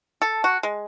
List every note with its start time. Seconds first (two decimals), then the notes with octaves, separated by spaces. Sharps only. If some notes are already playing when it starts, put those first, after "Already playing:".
0.22 A4
0.44 F#4
0.63 G#3